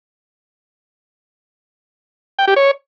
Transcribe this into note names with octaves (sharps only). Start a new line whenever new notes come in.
G5
G4
C#5